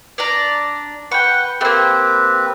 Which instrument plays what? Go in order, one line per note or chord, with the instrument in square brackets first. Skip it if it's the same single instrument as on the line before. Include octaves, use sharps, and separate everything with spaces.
[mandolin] D4 D5 A#5
[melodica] B4 F#5 [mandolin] G5 C#6
[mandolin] A3 A#3 [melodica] C4 G4 B4